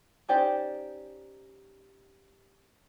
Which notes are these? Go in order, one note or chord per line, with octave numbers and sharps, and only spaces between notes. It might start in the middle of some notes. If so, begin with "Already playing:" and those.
C#4 D#4 G4 C5 D5